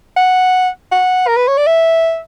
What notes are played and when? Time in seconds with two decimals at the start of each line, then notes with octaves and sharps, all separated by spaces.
0.16 F#5
0.92 F#5
1.27 A#4
1.37 B4
1.48 C#5
1.57 D5
1.67 E5